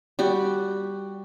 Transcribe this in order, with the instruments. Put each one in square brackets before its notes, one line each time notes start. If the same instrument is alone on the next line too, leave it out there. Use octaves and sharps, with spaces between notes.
[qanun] G3 F#4 G4